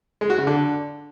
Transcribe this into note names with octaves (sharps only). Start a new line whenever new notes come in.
G#3
F#4
C#3
D3